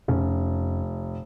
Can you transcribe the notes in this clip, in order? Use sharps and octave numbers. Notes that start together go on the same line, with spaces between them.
F1 F2 C#4